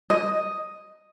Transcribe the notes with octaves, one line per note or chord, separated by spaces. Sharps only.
D#5